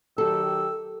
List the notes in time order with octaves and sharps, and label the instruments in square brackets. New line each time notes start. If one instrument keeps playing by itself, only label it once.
[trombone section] D#3 F#3 G4 [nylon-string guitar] A4 [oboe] E6